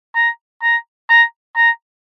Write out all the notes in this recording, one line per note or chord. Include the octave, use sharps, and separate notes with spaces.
A#5
A#5
A#5
A#5